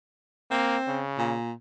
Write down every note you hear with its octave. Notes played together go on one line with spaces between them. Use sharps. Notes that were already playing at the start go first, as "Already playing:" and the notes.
A#3 C4
C#3
A#2